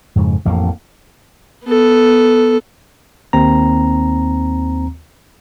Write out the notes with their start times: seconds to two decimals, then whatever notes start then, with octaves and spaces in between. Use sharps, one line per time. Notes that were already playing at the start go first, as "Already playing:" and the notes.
0.16 F2 G#2 C#3
0.45 A1 F2 A2 A#3
1.65 B3 A4
3.33 D#2 C4 A#5